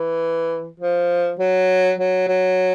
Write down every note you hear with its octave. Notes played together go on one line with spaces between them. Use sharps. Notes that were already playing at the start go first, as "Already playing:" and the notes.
Already playing: E3
F3
F#3
F#3
F#3